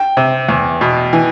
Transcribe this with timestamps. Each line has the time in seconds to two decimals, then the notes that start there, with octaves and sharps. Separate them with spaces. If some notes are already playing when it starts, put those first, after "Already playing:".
Already playing: G5
0.17 C3
0.49 E2
0.81 B2
1.13 E3